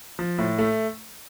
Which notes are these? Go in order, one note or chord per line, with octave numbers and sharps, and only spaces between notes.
F3
A2
A3